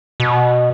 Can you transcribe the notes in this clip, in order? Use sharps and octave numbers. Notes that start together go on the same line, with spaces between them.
B2